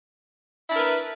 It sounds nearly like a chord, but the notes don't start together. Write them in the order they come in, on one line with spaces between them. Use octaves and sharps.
E4 D4 A#4 B4